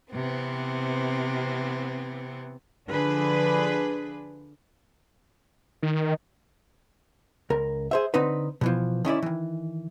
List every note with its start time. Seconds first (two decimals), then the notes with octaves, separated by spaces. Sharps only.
0.13 C3 E3 B3 C4
2.88 D3 F3 D4 G#4 B4
5.82 D#3
7.50 C#2 A#4
7.91 G#4 C5 E5
8.14 D3 C4 D#4 B4
8.61 B2 E3 F3
9.05 D#3 C#4 E4 D5
9.23 D#3 E3